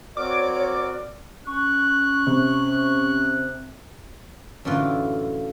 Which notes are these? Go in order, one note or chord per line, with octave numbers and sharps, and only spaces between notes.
C4 F#4 A#4 C#5 D5 D6
C#4 C#6 F#6
C3
F#2 A2 D3 E3 F4